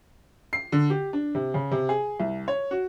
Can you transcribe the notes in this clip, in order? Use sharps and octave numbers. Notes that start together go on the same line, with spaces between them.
C7
D3
G4
D4
C3
C#3
C3
G#4
C2
C#5
F#4